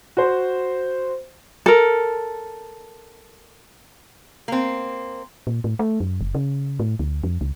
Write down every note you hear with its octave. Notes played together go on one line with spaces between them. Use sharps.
F#4 C5
A4 A#4
A#3 C4
A#2
A2
A3
F#2
F#1
C#3
A2
D2
F2
C#2